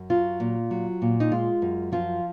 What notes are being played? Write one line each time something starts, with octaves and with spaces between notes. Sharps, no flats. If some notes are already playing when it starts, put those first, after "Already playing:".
Already playing: F#2
F#3 F4
A#2
F#3
A#2
D#4
G#3 F4
F#2
F3 F4